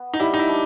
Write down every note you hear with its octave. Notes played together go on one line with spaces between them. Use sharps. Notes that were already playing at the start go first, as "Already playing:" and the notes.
Already playing: B3
D#4
G3 E4
D#4
E4
D4